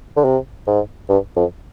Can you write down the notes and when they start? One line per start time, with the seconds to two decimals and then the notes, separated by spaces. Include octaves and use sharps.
0.17 D3
0.25 C3
0.67 G#2
1.09 G2
1.36 F2